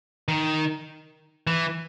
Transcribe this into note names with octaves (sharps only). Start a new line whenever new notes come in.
D#3
E3